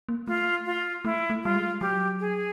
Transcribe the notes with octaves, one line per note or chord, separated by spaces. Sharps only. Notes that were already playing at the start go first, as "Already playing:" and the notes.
A#3
A3 F4
F4
A3 E4
A3
G3 F4
G#3
F#3 G4
G#4